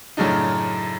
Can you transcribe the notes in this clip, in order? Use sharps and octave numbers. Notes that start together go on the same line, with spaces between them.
F#2 A2 C#3 D4 D#4